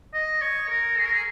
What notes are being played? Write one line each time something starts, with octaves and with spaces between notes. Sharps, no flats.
D#5
C#5
A#4
G#4
A#4
G#4